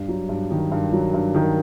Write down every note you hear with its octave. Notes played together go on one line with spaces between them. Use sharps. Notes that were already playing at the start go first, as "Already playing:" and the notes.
Already playing: G2
F#3
G2
D#3
G2
F#3
G2
D#3